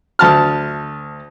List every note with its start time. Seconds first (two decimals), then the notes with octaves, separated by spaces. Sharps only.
0.19 D2 A5 F6